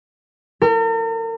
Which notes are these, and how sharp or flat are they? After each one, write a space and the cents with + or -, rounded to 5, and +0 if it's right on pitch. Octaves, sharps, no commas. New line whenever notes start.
A#4 -45